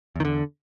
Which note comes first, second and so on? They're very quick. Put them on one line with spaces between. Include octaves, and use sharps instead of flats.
E2 D#3 D3